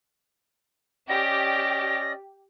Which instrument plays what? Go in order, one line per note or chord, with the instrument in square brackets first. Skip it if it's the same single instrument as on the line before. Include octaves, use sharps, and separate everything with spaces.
[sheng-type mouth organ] C#4 D5 D#5 [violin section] G4 [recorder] A#6